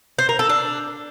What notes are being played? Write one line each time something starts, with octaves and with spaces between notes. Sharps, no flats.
C5
A#4
A4
D4